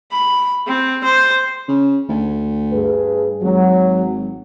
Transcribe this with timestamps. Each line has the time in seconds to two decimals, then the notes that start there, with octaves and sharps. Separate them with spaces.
0.11 B5
0.67 C4
1.04 C5
1.68 C#3
2.09 D2
2.72 G2 G#4 B4
3.43 G#1 F#3